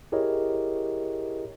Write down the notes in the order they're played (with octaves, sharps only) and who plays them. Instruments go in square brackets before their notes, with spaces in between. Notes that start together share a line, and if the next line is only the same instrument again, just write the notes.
[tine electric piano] E4 G4 G#4 A#4 C#5 D#5